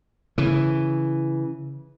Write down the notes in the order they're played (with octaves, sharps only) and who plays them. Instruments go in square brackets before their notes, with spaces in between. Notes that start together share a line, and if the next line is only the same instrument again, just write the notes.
[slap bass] C#3 E3